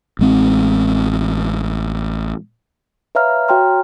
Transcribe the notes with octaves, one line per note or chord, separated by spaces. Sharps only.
A1 G#3 C4
B4 C#5 E5 F5 A#5 F6
F#4 C#5 G5 A#5 C6 F6